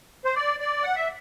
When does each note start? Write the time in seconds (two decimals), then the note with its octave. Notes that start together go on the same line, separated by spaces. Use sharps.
0.25 C5
0.35 D5
0.60 D5
0.83 F#5
0.96 E5